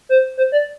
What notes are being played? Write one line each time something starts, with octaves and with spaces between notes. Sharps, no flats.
C5
C5
D5